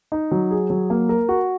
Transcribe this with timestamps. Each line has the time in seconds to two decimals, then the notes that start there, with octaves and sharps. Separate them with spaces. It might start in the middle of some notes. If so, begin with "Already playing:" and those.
0.12 D#4
0.31 F#3
0.51 G#4
0.70 F#3
0.90 A#3
1.09 A#4
1.29 F#4